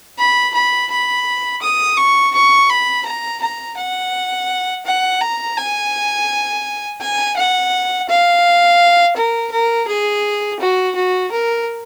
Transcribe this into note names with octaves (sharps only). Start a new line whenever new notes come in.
B5
B5
B5
D#6
C#6
C#6
B5
A#5
A#5
F#5
F#5
A#5
G#5
G#5
F#5
F5
A#4
A#4
G#4
F#4
F#4
A#4